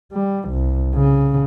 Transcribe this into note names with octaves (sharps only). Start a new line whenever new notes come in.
G3
C2
C#3